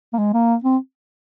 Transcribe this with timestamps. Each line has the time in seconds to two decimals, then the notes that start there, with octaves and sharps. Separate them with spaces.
0.13 A#3
0.18 G#3
0.34 A#3
0.64 C4